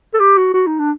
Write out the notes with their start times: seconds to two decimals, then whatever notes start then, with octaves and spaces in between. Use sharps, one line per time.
0.14 A4
0.20 G4
0.37 F#4
0.54 F#4
0.67 D#4
0.79 D4